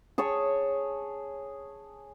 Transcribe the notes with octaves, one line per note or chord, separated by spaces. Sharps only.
G#4 C#5 A5 C#6